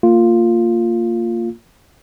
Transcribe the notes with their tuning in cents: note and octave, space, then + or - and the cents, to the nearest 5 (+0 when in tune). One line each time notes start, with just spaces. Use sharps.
A#3 -25 F4 +0